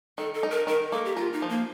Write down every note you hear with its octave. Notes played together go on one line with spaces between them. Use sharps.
D#3 A4
A4
D#4
A#4
D#3 A#4
A#3 A4
G4
F4 A#4
D#4
F3
A#3